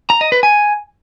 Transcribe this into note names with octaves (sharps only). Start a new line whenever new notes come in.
A#5
D#5
B4
G#5